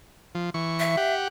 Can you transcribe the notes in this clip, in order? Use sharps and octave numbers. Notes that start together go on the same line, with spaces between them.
F3
E3 C#6
E5
G4 F#5